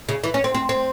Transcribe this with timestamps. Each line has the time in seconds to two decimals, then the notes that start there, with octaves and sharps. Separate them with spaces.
0.09 C#3
0.24 E3
0.34 C#4
0.44 C4
0.55 C4
0.69 C4